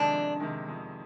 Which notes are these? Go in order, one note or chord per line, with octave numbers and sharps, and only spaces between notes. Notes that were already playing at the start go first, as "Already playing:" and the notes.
Already playing: F2 C3 D#3 G#3 D4
F2
C3 D#3 G#3
F2